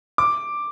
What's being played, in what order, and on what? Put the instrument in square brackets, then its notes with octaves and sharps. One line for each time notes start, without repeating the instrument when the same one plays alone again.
[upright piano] D6